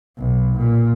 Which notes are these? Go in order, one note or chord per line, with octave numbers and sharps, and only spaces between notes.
B1
A#2